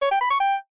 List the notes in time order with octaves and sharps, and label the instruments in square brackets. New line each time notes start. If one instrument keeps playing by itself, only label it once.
[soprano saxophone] C#5
G5
B5
C#6
G5